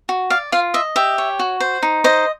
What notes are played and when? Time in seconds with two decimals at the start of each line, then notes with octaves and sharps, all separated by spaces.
0.09 F#4
0.30 D5 F5
0.52 F4 F5
0.74 D#5 E5
0.96 G4 E5
1.18 C#5
1.39 F#4
1.60 C5
1.83 D#4
2.04 C5 D#5